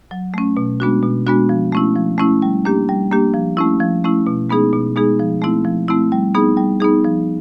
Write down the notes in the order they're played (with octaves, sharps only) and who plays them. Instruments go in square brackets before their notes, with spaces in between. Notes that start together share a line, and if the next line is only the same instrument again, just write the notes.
[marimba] F#3
A3 C#4
B2
G#3 B3 D4 F#4
B2
G#3 B3 D4 F#4
F3
A3 C#4 E4
F3
A3 C#4 E4
G3
A#3 D4 G4
G3
A#3 D4 G4
F3
A3 C#4 E4
F3
A3 C#4 E4
B2
G#3 B3 D#4 G#4
B2
G#3 B3 D#4 G#4
F3
A3 C4 E4
F3
A3 C4 E4
G3
B3 D#4 G#4
G3
B3 D#4 G#4
F3